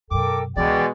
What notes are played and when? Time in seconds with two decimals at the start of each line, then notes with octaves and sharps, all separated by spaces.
0.11 F#2 B2 A4 A#4 G5 D6
0.56 C#2 B2 E3 G#3 D5 G5